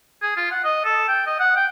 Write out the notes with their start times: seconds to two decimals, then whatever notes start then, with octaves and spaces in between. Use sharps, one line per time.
0.22 G#4
0.36 F4
0.51 F#5
0.64 D#5
0.84 A4
1.08 G5
1.27 D#5
1.40 F#5
1.56 G5